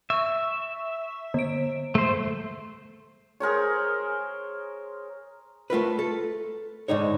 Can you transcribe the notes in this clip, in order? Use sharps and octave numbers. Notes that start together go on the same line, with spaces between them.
E5 C#6
D3 D7
A3 C5
G#4 A#4 C5 C#5
A3 F4 A#4 B4
A4
G#2 D3 D#4 C#5